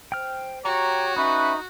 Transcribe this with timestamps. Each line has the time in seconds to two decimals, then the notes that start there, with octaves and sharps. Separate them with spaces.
0.12 C5 G5 F6
0.65 F#4 G4 C#5 G5 A#5
1.16 C#4 D#4 B4 E5 C#6